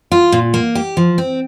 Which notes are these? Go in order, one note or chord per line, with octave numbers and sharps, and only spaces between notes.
F4
A#2
A#3
G4
F3
C4